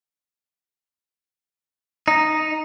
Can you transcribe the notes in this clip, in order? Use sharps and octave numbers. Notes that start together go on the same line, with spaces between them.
D#4